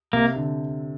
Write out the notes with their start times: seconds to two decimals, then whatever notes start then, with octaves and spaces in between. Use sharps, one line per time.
0.13 C3 A#3
0.36 D3